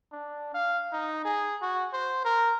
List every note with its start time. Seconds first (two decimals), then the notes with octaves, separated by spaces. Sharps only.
0.12 D4
0.54 F5
0.92 D#4
1.25 G#4
1.61 F#4
1.93 C5
2.25 A#4